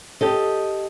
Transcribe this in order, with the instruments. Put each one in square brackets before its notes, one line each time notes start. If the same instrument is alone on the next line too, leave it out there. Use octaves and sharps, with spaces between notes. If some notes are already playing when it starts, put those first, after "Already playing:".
[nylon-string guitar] G4 A4 D#5